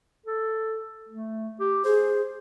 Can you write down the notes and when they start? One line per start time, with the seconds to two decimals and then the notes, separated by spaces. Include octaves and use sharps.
0.26 A4
1.09 A3
1.60 G4
1.85 G#4 C5